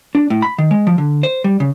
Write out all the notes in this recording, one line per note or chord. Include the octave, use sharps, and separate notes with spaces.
D4
A2
B5
D#3
G#3
F3
D3
C5
G3
C#3